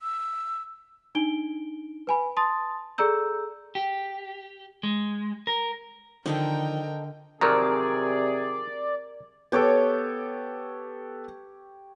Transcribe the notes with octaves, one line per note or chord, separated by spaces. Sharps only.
E6
D4 D#4 D7 G7
B4 G#5 B5
A5 C6 D#6 A6
G#4 A4 D5 A#5 E6 G6
G4
G#3
A#4
D3 D#3 F3 C4 D#4 A4 A#4 G5
C3 D#3 F3 F#3 G#4 A#4 D5 A#5
B3 G4 A4 C#5 D6